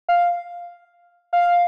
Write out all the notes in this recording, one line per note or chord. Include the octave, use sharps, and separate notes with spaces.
F5
F5